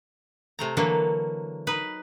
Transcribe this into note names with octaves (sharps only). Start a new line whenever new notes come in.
C3 A3 A#5
D3 E3 F#3 A#3
D#4 B4